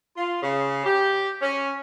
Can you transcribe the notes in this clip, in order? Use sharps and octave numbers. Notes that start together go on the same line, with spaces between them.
F4
C#3
G4
C#4